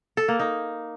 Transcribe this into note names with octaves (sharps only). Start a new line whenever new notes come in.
A4
A#3
D#4